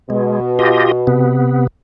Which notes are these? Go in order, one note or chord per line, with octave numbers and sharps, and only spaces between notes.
B2 G#3
F4 G4 D#5
C3 B3